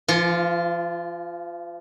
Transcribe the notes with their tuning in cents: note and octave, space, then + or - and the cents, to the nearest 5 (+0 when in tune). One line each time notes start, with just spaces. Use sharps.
F3 -40 F4 +0